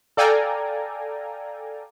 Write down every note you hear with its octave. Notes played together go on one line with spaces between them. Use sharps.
A4 D5 F5 G5 G#5 A#5